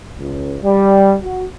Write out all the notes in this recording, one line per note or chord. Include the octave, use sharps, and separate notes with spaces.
C#2
G3
F#4